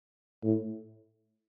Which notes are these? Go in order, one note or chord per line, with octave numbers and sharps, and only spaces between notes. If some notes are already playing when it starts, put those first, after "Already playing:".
A2